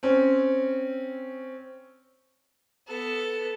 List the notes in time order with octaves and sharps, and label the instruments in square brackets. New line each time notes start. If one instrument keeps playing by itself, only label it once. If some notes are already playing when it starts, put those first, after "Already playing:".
[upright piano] C4 C#4
[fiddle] B3 A4